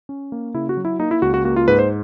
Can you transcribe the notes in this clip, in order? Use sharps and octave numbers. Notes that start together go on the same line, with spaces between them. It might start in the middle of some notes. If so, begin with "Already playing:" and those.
C#4
A#3
C#3 E4
F#4
F#3
E4
A#3 D#4
E4
C#2 F#4
F#4
A#3 F#4
F4
G#2 B4
C5